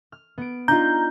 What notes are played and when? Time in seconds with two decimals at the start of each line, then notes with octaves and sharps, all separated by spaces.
0.12 F6
0.38 B3 D7
0.68 D4 D#4 F4 A#5 G6